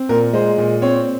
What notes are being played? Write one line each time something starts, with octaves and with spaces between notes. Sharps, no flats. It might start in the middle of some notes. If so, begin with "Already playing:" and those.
Already playing: C4
A#2 A#4
G#3 C5
A#2
C4 C#5